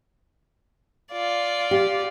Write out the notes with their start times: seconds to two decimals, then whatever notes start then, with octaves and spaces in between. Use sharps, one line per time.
1.12 F4 D5
1.71 G4